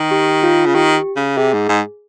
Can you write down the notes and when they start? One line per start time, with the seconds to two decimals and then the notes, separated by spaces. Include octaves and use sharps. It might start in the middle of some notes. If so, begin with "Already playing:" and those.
Already playing: D#3
0.11 G4
0.43 F4
0.66 C#3
0.74 D#3 G4
1.16 C#3
1.37 C3 G#4
1.53 G#2
1.69 G#2